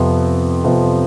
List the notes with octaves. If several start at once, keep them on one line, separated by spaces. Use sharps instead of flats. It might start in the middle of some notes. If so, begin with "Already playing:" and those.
Already playing: F2 C3 F3 B3
F2 C3 F3 B3